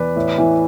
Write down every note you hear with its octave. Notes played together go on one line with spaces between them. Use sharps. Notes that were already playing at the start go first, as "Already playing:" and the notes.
Already playing: E2 B4 D5
A2
E3